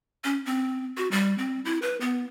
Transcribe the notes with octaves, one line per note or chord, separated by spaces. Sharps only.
C#4
C4
F#4
G3
C4
E4
B4
B3